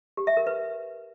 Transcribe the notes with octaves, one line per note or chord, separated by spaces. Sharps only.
G4
E5
A#4
B4